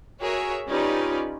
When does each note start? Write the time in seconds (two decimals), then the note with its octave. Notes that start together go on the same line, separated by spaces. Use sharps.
0.21 F#4 G#4 A#4 C#5 E5
0.68 C#4 D#4 F4 G4 B4 D5